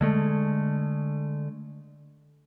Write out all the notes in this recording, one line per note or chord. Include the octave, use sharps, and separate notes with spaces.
D3 G#3 A3